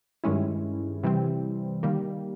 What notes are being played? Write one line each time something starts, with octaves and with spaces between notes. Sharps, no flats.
G2 D#3 G#3 C#4 E4
C3 E3 G3 C4
D#3 G3 A#3